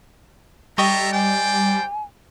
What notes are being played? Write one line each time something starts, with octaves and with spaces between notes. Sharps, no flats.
G3 G4 A4 D#5 E5 A#5 C#6
C5 D5 G5 G#5